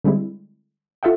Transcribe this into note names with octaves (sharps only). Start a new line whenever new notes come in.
D3 G3 G#3 C4 E4
F4 A4 E5 F#5 G5